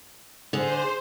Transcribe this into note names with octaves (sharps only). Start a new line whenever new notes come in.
D3 G#4 C5